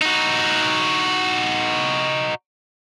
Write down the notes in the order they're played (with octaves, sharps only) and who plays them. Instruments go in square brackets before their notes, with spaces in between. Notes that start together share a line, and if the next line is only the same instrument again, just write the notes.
[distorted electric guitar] D#4 F#4